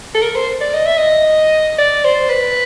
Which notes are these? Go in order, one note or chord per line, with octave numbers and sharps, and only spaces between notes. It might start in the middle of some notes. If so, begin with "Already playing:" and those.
A4
A#4
C5
D5
D#5
E5
D#5
D5
C5
B4